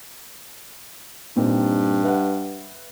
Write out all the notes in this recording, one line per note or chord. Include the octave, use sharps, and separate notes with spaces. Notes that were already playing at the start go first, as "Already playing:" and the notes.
G2 A#2 C4 D#4
B4 E5 F#5